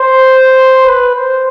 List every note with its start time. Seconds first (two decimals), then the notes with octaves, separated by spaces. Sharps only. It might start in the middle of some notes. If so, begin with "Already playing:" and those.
Already playing: C5
0.86 B4
1.15 C5